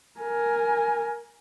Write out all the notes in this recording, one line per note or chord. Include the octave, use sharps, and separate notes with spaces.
A#4 G#5